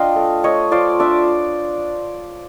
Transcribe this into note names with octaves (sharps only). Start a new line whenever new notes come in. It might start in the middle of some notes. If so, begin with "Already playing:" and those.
Already playing: D4 F4 D#5 F5 G5
A3
A3 C#5 D#5
F4 C5 D5
D4 D5 E5